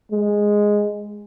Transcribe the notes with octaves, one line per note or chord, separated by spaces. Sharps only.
G#3